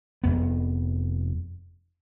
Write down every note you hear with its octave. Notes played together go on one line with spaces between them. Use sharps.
F1 F2 B3